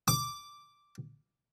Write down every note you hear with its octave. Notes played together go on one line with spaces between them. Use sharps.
D6